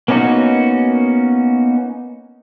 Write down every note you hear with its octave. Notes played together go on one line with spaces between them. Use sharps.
A#3 B3 C#4 D#4 F#4